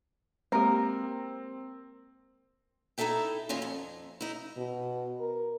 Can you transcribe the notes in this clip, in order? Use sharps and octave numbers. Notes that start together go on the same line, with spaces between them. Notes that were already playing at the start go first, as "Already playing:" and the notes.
G#3 A#3 C4 G4 A#4
D#4 E4 A4 E5 G5
A#2 D#3 C#4 F4
F2
D#4 E4
B2
A#4